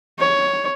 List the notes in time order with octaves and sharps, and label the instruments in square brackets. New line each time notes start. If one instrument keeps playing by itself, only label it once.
[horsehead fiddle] C#5